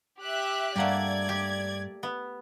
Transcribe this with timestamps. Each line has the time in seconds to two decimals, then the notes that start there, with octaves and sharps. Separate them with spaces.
0.21 G4 E5 F#6
0.76 G2 A3 A#3 G4 D5 F#5 G#6
1.29 G4
2.03 B3